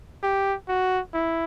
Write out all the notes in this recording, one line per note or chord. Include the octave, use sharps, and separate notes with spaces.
G4
F#4
E4